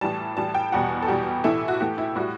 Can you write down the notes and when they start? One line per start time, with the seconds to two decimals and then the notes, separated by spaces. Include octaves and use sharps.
0.01 A2 E3 G3 A5
0.37 A2 E3 G3 A5
0.55 G5
0.72 E2 B2 G3 F#5
1.02 A4
1.08 E2 B2 G3 G4
1.44 A2 E3 A3 E4
1.68 F#4
1.80 A2 E3 A3 G4
1.98 E4
2.16 A2 G3 F#4